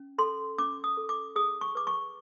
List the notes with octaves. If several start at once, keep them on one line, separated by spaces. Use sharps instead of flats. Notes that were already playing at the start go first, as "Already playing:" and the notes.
Already playing: C#4
A4 C6
C#4 D6
D#6
A4
D6
G#4 D#6
C#6
B4 D6
C#6